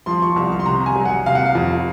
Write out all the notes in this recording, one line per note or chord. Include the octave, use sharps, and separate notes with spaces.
F3 C6
C#6
C2 C#6
C#6
C6
C3 A#5
G#5
F#3
F#5
C3 F5
F#5
F5
F2